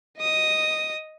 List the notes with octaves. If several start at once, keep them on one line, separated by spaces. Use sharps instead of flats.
D#5 D#6